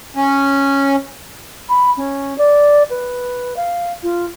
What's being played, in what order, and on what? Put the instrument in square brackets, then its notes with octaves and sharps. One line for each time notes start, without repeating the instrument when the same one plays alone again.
[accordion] C#4
[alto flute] B5
C#4
D5
B4
F5
F4